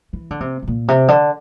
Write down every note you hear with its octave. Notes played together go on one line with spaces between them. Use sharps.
E3
D3
C3
C3
A#2
C3
D3